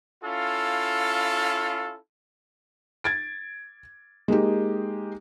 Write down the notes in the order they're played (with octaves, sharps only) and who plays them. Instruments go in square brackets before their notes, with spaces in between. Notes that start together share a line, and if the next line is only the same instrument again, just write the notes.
[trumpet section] C#4 E4 F4 A4 F5
[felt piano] G#6 A6 D7
G#3 A#3 D#4 G4